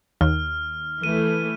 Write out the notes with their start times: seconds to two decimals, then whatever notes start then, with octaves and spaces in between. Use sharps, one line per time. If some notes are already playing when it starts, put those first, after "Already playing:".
0.21 D#2 F6
1.04 E3 A3 D#7